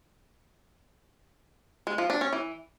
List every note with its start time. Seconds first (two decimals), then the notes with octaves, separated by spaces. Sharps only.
1.87 G#3
1.98 F3
2.10 D4
2.21 C#4
2.33 E3